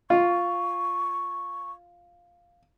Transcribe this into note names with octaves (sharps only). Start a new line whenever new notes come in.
F4 C#6